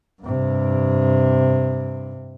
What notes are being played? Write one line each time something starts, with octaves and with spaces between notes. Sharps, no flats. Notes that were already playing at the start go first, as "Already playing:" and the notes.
G2 C3